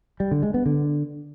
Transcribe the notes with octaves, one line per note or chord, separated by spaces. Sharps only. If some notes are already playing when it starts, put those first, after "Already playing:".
G3
D3
G#3
B3
D3